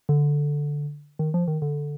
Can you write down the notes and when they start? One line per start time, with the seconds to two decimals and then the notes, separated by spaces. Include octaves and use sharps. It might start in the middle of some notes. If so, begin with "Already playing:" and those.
0.09 D3
1.19 D#3
1.34 F3
1.48 D#3
1.62 D3